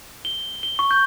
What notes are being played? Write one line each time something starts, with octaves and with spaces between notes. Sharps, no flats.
G7
G7
C#6
G6